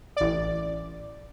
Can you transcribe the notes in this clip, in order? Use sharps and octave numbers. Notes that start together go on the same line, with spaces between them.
A1 D5